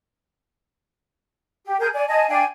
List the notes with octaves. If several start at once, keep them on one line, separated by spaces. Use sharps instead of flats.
G4
G#4 A#4 G#5 G6
D5 G#5
D#5 G#5 A5
D4 F5 G5 G#5